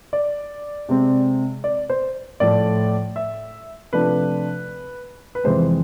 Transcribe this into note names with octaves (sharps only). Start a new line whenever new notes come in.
D5
C3 G#3 C4
D5
C5
A2 F3 A3 D5
E5
C3 F3 A3 D4 F4 B4
B4
F2 C3 E3 G#3 C4 C5